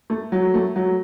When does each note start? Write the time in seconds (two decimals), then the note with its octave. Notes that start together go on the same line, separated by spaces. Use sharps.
0.10 A3
0.32 F#3
0.54 A3
0.76 F#3